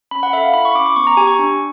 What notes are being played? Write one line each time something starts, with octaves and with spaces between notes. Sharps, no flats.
C#4 B5
F#5
A4 E5
F5
E4 B5
C#6
C#4 D6
D6
B3 C#6
A#5
G4 G#5
C#6
D4